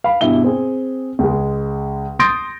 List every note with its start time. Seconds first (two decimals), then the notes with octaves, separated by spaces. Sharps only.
0.04 F5 B5
0.21 G2 B2 E4 G7
0.44 C4 G#4
1.19 C#2 G#3
2.19 C6 D#6 G6 A6 A#6 D7